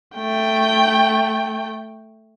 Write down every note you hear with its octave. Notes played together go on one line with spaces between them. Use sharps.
A3 G5